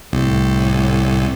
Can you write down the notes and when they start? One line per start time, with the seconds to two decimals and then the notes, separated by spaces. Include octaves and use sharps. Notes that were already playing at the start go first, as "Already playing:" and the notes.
0.13 C2 A2